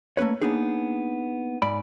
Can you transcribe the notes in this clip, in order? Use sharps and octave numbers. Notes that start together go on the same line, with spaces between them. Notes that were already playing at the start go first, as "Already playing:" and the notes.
A3 A#3 C#4 B4 C#5
A#3 B3 D4 D#4 G#4
G#2 D5 B5